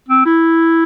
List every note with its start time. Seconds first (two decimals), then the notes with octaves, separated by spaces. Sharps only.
0.09 C4
0.26 E4